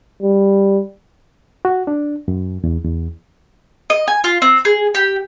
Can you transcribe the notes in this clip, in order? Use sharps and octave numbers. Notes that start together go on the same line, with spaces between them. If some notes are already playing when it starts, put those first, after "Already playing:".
G3
F#4
D4
F#2
E2
E2
D#5
G#5
F4
C4
G#4
G4